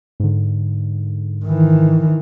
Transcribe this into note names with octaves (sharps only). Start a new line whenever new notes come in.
G#2 D3
D#3 E3